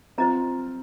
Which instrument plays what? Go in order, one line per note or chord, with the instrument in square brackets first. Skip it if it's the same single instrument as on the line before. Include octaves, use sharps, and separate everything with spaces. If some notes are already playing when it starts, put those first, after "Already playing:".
[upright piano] C4 F4 [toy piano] C5 D#5 A#5